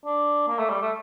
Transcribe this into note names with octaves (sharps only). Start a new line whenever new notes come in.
D4
A#3
A3
G3
A3